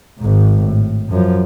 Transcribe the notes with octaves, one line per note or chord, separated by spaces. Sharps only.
G#1 G#2
A2
F#2 F3